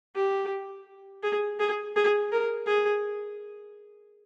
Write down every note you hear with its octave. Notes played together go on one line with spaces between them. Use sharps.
G4
G#4
G#4
G#4
A#4
G#4